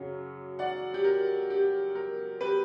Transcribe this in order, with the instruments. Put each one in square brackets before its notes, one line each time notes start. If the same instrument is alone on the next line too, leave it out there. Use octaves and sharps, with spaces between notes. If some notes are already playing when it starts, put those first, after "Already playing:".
Already playing: [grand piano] F#2 C#3 F#3
D5 F#5
G4
A#4
G4
A#4
G4 B4